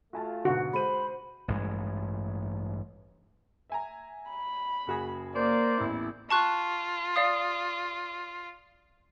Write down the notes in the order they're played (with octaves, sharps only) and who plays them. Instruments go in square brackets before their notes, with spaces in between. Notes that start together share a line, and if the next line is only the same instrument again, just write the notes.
[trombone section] A3 F4 [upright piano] F#4 G#5 A5
[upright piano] D2 G#2 B2 [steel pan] F#4
[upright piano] G#3 D#7 [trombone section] C5 [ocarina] B5
[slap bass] A1 G2 G#3
[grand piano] E5 G#5 A#5
[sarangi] B5
[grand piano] F#1 F#4 G#4
[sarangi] A#3 [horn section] A#4 C5 D5
[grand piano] A1 E2 [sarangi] E4
[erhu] F4 [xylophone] A5 C#6 F#6
[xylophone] D5 F5 D#6